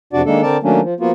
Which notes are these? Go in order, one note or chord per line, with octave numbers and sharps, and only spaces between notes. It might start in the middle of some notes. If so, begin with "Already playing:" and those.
F2 C3 D4 F#4 D5
D#3 G#3 A#3 D4 A4
D3 C4 A#4 D5 A5
D#3 F#3 A3 A#3 C#4 D4
F3
F3 A#3 B3 F4 F#4